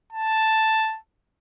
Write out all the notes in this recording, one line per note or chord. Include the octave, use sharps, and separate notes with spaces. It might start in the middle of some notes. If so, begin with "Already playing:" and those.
A5